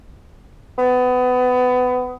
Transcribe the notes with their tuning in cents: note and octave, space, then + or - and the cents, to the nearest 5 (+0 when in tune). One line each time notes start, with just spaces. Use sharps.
B3 +25